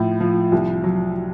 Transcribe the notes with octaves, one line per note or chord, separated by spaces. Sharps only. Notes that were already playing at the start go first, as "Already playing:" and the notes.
Already playing: A2 F3
F3
C2
F#3